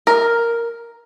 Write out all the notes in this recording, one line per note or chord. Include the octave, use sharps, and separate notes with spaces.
A#4